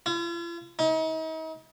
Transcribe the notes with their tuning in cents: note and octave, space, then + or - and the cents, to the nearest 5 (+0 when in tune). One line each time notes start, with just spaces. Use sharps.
F4 -45
D#4 +40